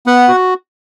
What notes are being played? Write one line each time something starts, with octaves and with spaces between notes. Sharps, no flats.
B3 F#5
F#4